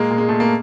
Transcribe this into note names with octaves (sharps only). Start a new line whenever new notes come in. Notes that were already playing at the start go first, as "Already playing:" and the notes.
Already playing: A#2 G#3 A#3
A#2
G#3
A#2 A3
A#3